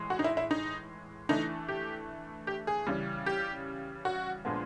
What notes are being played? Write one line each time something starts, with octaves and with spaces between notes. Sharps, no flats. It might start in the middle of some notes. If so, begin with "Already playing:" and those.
Already playing: A2 E3 G#3
F#4
D#4
E4
E4
D#4
E3 A3 D4 D#4
G4
G4
G#4
C#3 E3 G3
G4
F#4
A#2 F3 G#3 B3 D4